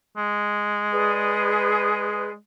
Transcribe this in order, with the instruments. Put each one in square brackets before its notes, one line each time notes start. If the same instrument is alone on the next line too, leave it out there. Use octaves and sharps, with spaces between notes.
[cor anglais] G#3
[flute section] G#4 B4 D5